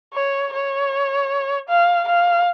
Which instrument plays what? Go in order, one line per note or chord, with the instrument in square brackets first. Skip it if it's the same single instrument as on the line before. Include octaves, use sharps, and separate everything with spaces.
[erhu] C#5
C#5
F5
F5